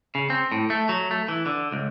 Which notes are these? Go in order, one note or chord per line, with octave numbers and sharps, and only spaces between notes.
C#3
C4
A2
A3
F#3
A3
E3
D3
C#2